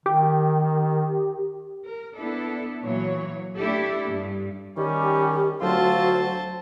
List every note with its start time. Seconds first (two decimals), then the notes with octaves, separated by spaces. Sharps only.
0.06 D#3 G4
1.85 A#4
2.16 B3 D4 E4 A4
2.82 A#2 E3 F#3 C#5
3.57 A3 D4 E4 G4 A4
4.10 G2
4.77 D#3 G3 C#4 G4
5.62 D2 F#3 A3 C4 F4 C5 A5